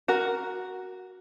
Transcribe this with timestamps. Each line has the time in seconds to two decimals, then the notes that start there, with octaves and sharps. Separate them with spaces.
0.08 F#4 A#4